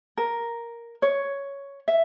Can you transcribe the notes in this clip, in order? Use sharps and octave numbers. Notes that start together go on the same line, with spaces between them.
A#4
C#5
E5